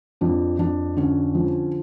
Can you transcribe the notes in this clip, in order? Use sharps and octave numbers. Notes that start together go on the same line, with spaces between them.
F2 D4
F2 D4
D3 C#4
F3